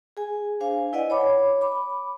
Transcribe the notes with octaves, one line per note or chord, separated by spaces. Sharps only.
G#4 G#5
D4 C5 F5 G#5
E4 B4 D5 D#5 F#5 G#5
C#5 B5 D6
B5 D6